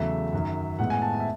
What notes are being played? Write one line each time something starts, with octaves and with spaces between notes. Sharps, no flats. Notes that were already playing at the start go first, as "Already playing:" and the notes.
Already playing: E2 C#3 F#3 A3 E5
F#2 D#3 F#3
A2 G#3 B3 F#5
G#5
A5
A5
E5